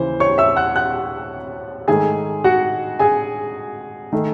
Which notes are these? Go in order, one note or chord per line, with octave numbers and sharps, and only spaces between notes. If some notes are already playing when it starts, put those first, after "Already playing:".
Already playing: D#2 C#3 E3 C5
C#5 C#6
E5 E6
F#5 F#6
F#5 F#6
G#2 D#3 A3 G#4 G#5
F#4 F#5
G#4 G#5
D#3 A3